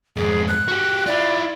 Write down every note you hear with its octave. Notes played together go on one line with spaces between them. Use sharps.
F2 G#2 G#4
F#6
F#4 G4
E4 F4 D5